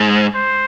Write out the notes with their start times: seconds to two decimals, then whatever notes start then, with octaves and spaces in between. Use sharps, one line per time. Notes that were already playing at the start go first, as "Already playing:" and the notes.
Already playing: G#2
0.35 C5